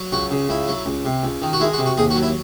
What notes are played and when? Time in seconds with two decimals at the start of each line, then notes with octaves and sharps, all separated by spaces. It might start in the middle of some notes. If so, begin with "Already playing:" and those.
Already playing: F#3
0.12 C#2 F#4
0.31 C#3
0.49 C#2 E4
0.68 F#3
0.86 C#2
1.05 C3
1.23 C#2
1.42 D#3
1.53 F#4
1.60 G#3 E4
1.73 F#4
1.79 C3
1.86 F#4
1.97 D#2 G#4
2.11 F#4
2.16 F#3
2.23 E4